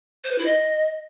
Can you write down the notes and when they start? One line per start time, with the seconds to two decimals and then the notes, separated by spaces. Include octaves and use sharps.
0.24 C5
0.31 B4
0.38 E4
0.46 D#5